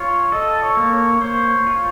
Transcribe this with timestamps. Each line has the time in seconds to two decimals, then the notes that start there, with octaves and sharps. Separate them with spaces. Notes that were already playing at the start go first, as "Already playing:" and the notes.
Already playing: F4 C#5
0.32 A4 D#5
0.62 C#5
0.77 A#3
0.91 C#5
1.21 C5 C#5
1.67 F4